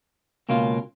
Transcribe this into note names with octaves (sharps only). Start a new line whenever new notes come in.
C#2 B2 A#3 C#4 F4